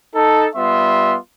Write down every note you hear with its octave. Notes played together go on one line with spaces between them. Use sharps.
D#4 A4
G3 B3 F4 E5 C6